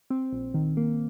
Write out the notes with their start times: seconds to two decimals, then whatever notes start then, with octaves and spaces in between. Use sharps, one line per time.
0.10 C4
0.33 A#1
0.54 D#3
0.77 A#3